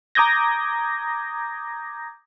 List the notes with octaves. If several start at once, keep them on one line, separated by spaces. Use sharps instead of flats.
A#5 D6 D#6 G6 G#6 A#6